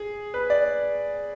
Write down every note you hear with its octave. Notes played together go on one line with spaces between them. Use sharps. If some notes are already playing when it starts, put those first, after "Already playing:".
Already playing: G#4
B4
D5